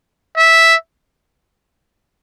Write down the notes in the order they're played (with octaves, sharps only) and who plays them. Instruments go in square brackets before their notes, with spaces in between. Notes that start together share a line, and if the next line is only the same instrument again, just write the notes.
[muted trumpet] E5